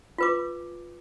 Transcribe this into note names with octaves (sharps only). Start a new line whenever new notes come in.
F4 B4 D6